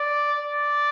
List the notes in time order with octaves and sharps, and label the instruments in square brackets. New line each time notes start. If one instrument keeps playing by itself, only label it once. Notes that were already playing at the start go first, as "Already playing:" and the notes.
Already playing: [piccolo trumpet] D5
D5